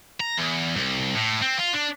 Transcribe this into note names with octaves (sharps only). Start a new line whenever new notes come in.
A#5
E2
C2
A2
C4
F4
D4